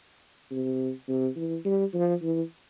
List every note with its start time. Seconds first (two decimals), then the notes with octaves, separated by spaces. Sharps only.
0.51 C3
1.08 C3
1.36 E3
1.65 G3
1.94 F3
2.22 E3